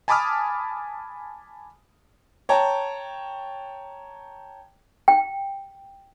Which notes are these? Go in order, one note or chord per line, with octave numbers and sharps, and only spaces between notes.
G#5 A5 B5 D6 D#6 F6
C#5 G5 A5 A#5
G5